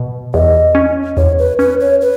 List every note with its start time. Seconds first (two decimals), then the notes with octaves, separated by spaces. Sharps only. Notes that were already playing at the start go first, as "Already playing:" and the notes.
Already playing: B2
0.34 E2 D#5
0.75 C#4
1.17 E2 C#5
1.38 B4
1.59 C#4 B4
1.80 C#5
2.01 B4